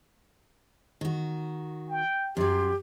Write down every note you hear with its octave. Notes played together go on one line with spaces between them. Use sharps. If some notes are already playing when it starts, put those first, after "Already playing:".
D#3 F#4
G5
F#2 F#3 G4 C6